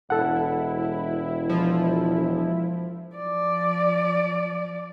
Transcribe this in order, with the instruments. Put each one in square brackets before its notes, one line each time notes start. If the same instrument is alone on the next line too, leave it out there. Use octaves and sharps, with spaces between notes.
[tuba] E1 [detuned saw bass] E4 [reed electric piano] A4 F#5
[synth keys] F3
[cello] F3 D5